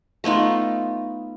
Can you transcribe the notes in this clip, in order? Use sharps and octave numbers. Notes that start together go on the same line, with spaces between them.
A3 B3 D#4 F4